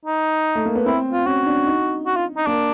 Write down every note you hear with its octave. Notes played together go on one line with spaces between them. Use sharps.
D#4
A3
A#3
B3
C4 E4
F4
C#4 F#4
D4
D#4
F#4
F4
D#4
A#3 D4